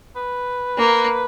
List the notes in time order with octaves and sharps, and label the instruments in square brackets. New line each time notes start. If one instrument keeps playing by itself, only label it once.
[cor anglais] B4
[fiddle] A#3